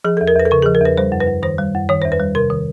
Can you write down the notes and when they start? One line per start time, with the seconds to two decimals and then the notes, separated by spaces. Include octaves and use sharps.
0.04 F3 G#4
0.17 A4
0.21 E2
0.28 A#4
0.35 E2 B4
0.45 A4
0.51 C#3 A#4
0.62 G#4
0.66 F3
0.75 A#4
0.81 E2 B4
0.98 G3 C5
1.12 F#2
1.20 B4
1.28 F#2
1.43 D#3 C5
1.58 G3
1.75 F#2
1.89 D#3 C#5
2.02 E2 C5
2.12 B4
2.20 G3
2.35 C3 A#4
2.50 D#3